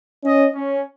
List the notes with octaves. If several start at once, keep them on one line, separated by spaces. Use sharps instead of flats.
C#4 D#5
C#4